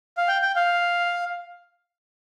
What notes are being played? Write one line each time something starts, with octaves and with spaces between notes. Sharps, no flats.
F5
G5
G5
F5